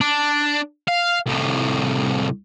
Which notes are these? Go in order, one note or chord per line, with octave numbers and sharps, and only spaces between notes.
D4
F5
C2 A2